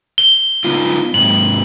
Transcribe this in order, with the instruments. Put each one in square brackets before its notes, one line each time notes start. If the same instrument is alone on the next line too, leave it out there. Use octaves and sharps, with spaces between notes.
[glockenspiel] G7
[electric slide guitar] B3 D#4 F4
[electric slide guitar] G#2 C3 [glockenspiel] F#7